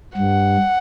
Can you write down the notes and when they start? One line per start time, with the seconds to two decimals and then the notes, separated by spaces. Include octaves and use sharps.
0.17 G2 F#5